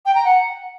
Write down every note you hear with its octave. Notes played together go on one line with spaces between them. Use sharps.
G5
A#5
F#5